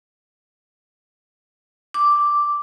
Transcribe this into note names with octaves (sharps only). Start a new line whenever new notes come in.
D6